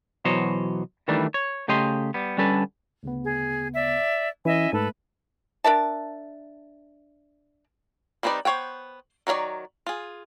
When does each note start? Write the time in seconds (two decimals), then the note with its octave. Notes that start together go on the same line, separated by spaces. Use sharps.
0.25 B2 E3 F#3 C5 C#5 D#5
1.08 D#3 E3 G3 A3 D4
1.34 C#5
1.68 C#3 A3 G4 D#5 C6
2.14 G3 B3
2.37 D3 G3 C#4 A4 B4
3.03 D2 C#3 B3
3.22 G#4
3.74 D5 E5
4.45 E3 C#4 E4 D#5 E5 G#5
4.73 G#2 A3 A4 B4
5.64 D4 A#4 E5 A5
8.23 G3 C4 D#4 B4 D5
8.45 B3 C5 C#5 F#5 G5
9.27 D#3 F#3 F4 C#5 D5
9.86 F4 G#4